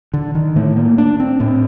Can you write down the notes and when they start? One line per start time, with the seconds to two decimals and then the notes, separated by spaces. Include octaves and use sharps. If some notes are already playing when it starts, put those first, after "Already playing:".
0.14 D3
0.35 D#3
0.56 A2 A3
0.76 A#3
0.98 D4
1.20 C4
1.40 A2 C4